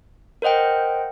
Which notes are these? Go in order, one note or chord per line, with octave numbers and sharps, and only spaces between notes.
A#4 C5 D#5 F#5 G5